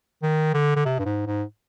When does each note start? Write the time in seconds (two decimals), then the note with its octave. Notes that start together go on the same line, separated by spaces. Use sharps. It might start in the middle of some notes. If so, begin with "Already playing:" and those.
0.22 D#3
0.54 D3
0.76 D3
0.85 C3
0.99 G2
1.05 G#2
1.26 G#2